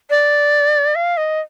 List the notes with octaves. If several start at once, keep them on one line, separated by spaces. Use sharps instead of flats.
D5
F5
D#5